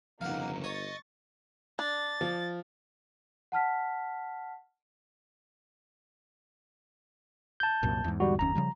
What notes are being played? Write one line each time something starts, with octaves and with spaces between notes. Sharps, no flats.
G1 F2 C#3 A#3 D#4 F5 F#5
C#5 D#5 C#6 A6
D4 A6
F3
F#5 A5 F6 B6
A5 G6
C2 F#2 A#2
E2 G#2
D3 G3 F#4
F#1 D#2 C#4 A#5
C#3 F3 G3